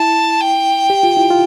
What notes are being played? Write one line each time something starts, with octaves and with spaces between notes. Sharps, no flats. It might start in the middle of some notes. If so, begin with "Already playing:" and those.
Already playing: E4 A5
G5
G4
F4
E4
F4